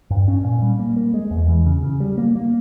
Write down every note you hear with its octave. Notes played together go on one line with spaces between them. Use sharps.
G2
C#4
A#2
G3
A#3
A#3
G#3
E2
E3
C#3
C#3
G3
A#3
A#3